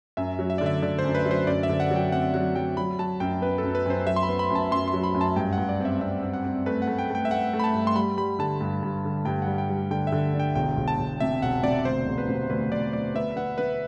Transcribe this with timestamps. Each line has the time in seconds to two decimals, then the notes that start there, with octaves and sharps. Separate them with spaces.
0.17 F#2 E5
0.39 F#3
0.50 E5
0.58 D3 D5
0.66 E5
0.82 D3 D5
0.99 C5
1.04 F#2
1.15 B4
1.25 F#3
1.31 C5
1.47 F#2 D5
1.63 E5
1.69 D3
1.80 F#5
1.91 F#3
1.96 G5
2.12 C4 F#5
2.34 F#3 F#5
2.55 F#3 G5
2.77 F#3 B5
2.98 F#3 A5
3.20 F#2 G5
3.41 B3 B4
3.58 A4
3.63 F#2
3.75 B4
3.86 F#2 C5
4.06 F#3 E5
4.16 C6
4.23 B5
4.29 B3
4.39 B5
4.50 F#2
4.55 A5
4.71 F#2 C6
4.88 C6
4.93 F#3
5.04 B5
5.15 F#2
5.21 A5
5.36 G2 G5
5.53 F#5
5.58 G2
5.69 D5
5.80 C4 E5
6.01 C4 E5
6.22 C4
6.33 F#5
6.45 C4
6.66 A3 B4
6.82 F#5
6.87 A3
6.98 G5
7.10 A3 G5
7.25 E5
7.31 A3 F#5
7.53 A3
7.60 B5
7.64 A5
7.74 G2
7.87 C6
7.95 G3 B5
8.17 G3 B5
8.39 D3 A5
8.61 G2
8.83 G2
9.05 D3
9.25 G2 G5
9.42 G3 F#5
9.58 G5
9.69 G3
9.91 D3 G5
10.07 E5
10.12 D3
10.33 D4
10.40 G5
10.55 E1 G5
10.77 E1
10.88 A5
10.98 E1
11.20 C3 E5
11.42 E1 F#5
11.63 C3 D5
11.85 D2 C5
12.07 E1
12.18 B4
12.29 C3
12.50 D2 B4
12.72 D2 D5
12.93 D2 D5
13.15 B3 E5
13.36 B3 F#5
13.58 B3 B4